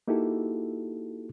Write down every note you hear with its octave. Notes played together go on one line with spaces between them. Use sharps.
A#3 D#4 E4 F#4 G4 A4